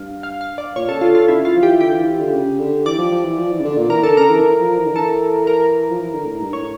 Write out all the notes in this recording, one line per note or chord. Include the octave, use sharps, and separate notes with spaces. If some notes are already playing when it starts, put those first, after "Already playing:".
Already playing: G2 F5
F5
F5
D5
A#2 C#5
C#3 A4
D3 F4
F4
C#3 E4
F4
F3
E3 G4
D3 G4
E3
E3
D3
C#3
D3
E3 D5
F3
F3
E3
F3
E3
C#3
D3
A#2
E3 A#4
D3 A4
C#3 A#4
E3
E3
F3
E3
D3
E3 A4
A#4
F3
E3
D3
A2
G2
A2 C#5